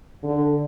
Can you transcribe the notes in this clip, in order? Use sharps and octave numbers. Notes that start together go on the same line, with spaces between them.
D3